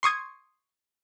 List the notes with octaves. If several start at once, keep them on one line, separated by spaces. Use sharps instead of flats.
C6 C#6 D#6 G#6